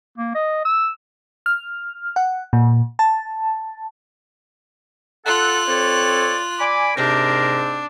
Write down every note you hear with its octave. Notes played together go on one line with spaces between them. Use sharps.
A#3
D#5
E6
F6
F#5
A#2
A5
F4 A4 F#5 F#6
C4 A4 C#5 D5
D5 G#5 B5 D6
G#2 C3 C4 D4 A#4